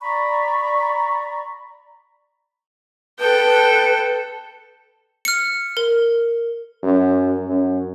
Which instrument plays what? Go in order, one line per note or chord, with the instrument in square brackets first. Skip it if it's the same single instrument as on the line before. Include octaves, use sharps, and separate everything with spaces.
[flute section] D5 A#5 B5 C#6
[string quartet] A4 [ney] B4 [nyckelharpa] G5
[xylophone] F6 C#7
A#4
[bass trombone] F#2
F#2